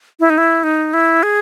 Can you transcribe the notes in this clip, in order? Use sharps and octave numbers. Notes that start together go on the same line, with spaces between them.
E4
D#4
E4
D#4
E4
G#4